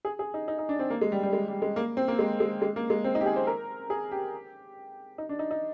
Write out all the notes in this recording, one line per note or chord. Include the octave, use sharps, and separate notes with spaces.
G#4
G#4
D#4
D#4
D#4
D4
C4
A#3
G#3
G3
G3
G#3
G3
G#3
A#3
C4
A#3
G#3
G#3
G#3
A#3
G#3
C4
D#4
G4
G#4
C5
A#4
G#4
G4
D#4
D4
D#4
D#4